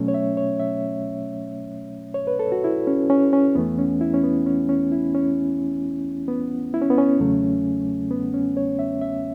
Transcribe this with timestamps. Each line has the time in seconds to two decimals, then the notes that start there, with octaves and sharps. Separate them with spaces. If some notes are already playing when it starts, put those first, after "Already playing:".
Already playing: B2 F#3 A3 C#4
0.08 C#5
0.14 E5
0.37 C#5
0.60 E5
2.14 C#5
2.27 B4
2.39 A4
2.52 F#4
2.64 E4
2.87 C#4
3.10 C#4
3.33 C#4
3.55 E2 E3 A3 B3
3.78 C#4
4.01 E4
4.14 C#4
4.24 B3
4.46 C#4
4.69 C#4
4.92 E4
5.15 C#4
6.28 B3
6.74 E4
6.82 C#4
6.90 B3
6.98 C#4
7.20 E2 C#3 F#3 A3
8.10 B3
8.34 C#4
8.57 C#5
8.79 E5
9.01 E5